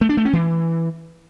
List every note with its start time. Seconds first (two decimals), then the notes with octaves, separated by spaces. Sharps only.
0.01 A3
0.09 D4
0.17 A3
0.25 C#4
0.33 E3